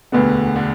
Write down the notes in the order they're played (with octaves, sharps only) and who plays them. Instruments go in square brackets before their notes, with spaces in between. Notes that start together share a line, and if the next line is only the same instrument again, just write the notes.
[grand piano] E1 D2 D3 [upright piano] B3
[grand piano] D3